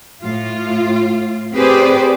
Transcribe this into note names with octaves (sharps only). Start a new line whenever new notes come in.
A2 F4
C4 G4 G#4 B4 C5 D5